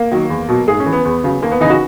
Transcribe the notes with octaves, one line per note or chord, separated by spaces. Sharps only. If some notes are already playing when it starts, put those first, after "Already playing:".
Already playing: A#3
D#3 F#3
E2
B2 F#3
G#2 G#4
C#4
E3
B3
E2 B3
C#3 F#3
D#2 A#3
B3
C#3 E3 D#4
F#4